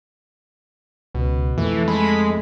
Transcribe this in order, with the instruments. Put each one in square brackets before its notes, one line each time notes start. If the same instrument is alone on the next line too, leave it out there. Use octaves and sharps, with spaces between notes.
[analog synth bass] C#2 [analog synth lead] B2
[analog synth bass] F2 [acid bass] E3 [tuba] A3
[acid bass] G#3 [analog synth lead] B5